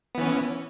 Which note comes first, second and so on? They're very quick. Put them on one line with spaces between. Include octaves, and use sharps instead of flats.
B3 E3 C#4